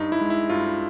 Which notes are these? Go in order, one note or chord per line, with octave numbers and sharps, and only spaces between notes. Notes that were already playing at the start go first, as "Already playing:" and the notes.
Already playing: G2 D#4
E4
G#3
E4
G2 F4